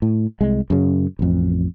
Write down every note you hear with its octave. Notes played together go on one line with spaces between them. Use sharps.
A2
C2 G#3
F#2 C#3
A1 F2